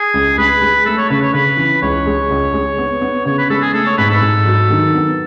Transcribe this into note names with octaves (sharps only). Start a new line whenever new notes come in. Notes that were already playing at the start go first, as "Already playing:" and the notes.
Already playing: G#4
C#2
G#3 B4
G#3
A3 A4
C#5
C#3 B4
C#5
C#3 B4
E3
C#2 C#5
G#3
C#2
G#3
B3
B3
C#3 C#5
B4
G#3 A4
G#4
A3 A4
C#5
G#2 B4
A4
G#2
F#3
D#3
B3